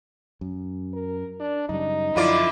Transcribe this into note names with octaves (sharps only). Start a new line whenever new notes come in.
F#2
A#4
D4
F#2 C#3 G3 D#4
F#2 D3 F3 E4 F4 D5